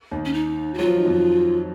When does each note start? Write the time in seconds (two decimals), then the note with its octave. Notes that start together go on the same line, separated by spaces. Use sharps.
0.11 D#2 D#3
0.25 C#4
0.34 D#4
0.74 F#4
0.78 F#3 F4
0.87 F3
0.97 D#3
1.06 F2 F3